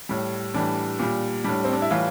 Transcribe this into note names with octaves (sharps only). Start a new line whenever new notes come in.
A2 G3
A2 E3 G3 D4
A#2 G3
A2 G3 D4
C4
D4
E4
A2 E3 G3 F4